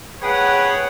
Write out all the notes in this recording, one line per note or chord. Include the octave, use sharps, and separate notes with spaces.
G#4 B4 C#5 F#5 G5